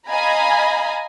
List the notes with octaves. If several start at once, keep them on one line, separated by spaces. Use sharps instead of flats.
D#5 F5 G#5 A#5 B5